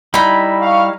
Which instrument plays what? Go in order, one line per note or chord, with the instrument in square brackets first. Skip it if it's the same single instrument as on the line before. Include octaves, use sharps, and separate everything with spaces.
[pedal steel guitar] G3 E4 [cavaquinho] D#4 B5
[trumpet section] F5 C#6